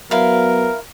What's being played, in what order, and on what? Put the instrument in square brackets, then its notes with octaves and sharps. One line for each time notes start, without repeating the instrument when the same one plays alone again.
[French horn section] F#3 B3 [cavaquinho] E4 F5 [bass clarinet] A#4